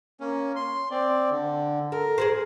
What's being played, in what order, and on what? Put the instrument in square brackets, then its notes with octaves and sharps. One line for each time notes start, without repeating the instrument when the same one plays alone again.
[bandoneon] A#3 C#4
C6
C4 D5
D3
[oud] A4 [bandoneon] A#4
[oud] G#4 A4 C5